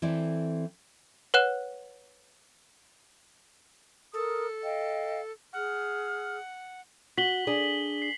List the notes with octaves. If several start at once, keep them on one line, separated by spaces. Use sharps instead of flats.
E3 C4 E4 A4 D5
B4 C#5 F#5 F#6 E7
A4 A#4 D#6
D#5 F5 G5
G#4 F#5 F6
F#4 B6 F#7 G7
D4 G#4
C7